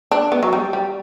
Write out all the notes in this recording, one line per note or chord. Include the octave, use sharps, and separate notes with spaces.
D4
B3
F#3
G3
G3